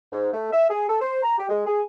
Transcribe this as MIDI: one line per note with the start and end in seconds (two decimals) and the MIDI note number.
0.12 0.29 44
0.34 0.50 57
0.51 0.67 76
0.69 0.87 68
0.88 1.00 69
1.01 1.18 72
1.23 1.36 82
1.38 1.47 67
1.49 1.63 56
1.66 1.82 68